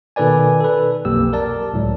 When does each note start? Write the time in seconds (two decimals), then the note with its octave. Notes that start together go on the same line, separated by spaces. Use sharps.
0.16 B2 D#3 A4 B4 D5 G#5
0.61 A4 B4
1.05 B1 F2 A#3 G4 E6
1.33 A#4 D5 A5
1.73 C#2 A2 F#3